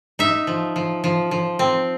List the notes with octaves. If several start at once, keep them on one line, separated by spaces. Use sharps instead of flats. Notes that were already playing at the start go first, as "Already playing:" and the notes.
D#4 E5
F3
F3
F3
F3
C4